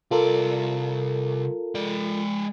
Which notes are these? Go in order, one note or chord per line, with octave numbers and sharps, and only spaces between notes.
C2 F4 A4 A#4 D5
G#3 D5